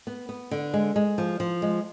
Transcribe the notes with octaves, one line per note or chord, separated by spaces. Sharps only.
B3
B3
D3
G#3
G#3
F3
F3
G#3